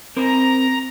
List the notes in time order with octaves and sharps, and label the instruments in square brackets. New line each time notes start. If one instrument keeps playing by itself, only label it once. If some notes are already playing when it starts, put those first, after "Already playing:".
[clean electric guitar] C4 A#4 C5 [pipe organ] A#5